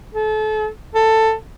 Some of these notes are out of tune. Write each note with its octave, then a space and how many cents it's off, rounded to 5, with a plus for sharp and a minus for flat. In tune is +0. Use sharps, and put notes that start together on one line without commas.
A4 -35
A4 +10